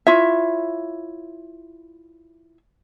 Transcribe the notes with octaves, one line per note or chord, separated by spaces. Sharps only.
E4 F4 C#5 E5